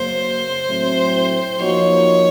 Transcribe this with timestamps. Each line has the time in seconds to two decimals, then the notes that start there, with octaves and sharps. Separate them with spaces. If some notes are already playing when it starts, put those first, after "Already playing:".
Already playing: F#2 C#3 F#3 A#3 C5
0.66 A2 F#3 A3 C4
1.60 F3 A#3 D#4 F#4 C#5